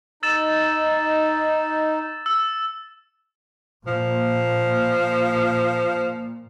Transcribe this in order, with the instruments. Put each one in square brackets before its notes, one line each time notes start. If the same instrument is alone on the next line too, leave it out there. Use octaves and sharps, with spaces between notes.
[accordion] D#4 [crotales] E6 A6 E7
[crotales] E6
[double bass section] A#2 [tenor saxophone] F3